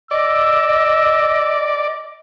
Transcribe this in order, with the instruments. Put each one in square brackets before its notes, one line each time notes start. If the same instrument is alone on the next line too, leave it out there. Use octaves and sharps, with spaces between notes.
[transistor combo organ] D5 [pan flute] D#5 [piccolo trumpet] E6